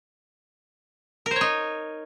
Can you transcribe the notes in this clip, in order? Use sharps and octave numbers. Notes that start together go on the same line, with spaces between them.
A#4
C5
C#5
D#4